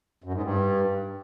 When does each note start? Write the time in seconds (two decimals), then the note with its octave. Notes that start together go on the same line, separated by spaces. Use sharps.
0.24 F#2
0.34 G#2
0.43 G2